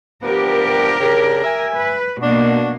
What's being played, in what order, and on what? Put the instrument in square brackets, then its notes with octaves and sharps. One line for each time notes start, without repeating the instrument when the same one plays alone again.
[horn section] F3 B3 D4 [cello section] G4 A#4
[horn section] C#3 D4
E5 G#5
[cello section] B4
[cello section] B2 A#3 [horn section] D4 F#4